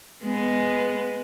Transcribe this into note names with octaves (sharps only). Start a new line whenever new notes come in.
G#3 B3